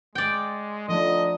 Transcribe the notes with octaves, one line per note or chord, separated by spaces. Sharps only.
G#3 D5 G5
D3 F3 A3 D#4 D#5